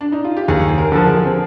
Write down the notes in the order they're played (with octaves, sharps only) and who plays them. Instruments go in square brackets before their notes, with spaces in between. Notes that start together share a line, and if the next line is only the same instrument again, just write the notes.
[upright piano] D4
D#4
F4
G4
[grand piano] D#2 [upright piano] G#4
[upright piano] G#4
A#4
[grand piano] D3 F3 [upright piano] A#4
[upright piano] G#4
C4